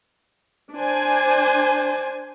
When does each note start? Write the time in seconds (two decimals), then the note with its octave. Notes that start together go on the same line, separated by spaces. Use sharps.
0.73 D4 C5 G#5